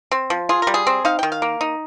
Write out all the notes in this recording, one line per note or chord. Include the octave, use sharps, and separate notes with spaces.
C4
F3
F4 G#4
G3 A#4
G#4
C4
D#4 F5
D#3 G5
F5
A#3
D#4